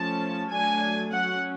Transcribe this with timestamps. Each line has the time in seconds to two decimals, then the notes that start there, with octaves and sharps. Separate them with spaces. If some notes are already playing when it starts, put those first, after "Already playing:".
Already playing: F3 A3 C#4 A5
0.51 F#3 A3 D4 G#5
1.12 F#3 C#4 F#5